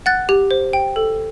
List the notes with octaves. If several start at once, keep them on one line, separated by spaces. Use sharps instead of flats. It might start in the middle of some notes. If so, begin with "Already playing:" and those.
F#5 F#6 A6
G4
C5
G5
A4